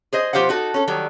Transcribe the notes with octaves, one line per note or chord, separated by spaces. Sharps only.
G#4 C5 D#5
B2 F3 G4 C5 F5 F#5
D#4 F#4 A4
C#4 A4
D#3 F#3 G3